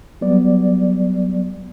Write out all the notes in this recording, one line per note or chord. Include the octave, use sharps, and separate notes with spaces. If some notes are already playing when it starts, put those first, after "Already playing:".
F#3 G3 B3 D5